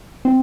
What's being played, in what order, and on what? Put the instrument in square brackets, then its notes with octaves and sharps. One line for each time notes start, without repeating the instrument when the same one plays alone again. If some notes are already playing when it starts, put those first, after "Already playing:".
[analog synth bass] C4